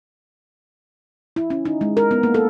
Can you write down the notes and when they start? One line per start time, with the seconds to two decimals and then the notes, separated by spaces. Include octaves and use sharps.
1.36 E4
1.50 C#4
1.65 D#4
1.81 G#3
1.97 A#4
2.11 B3
2.23 A#3
2.34 A4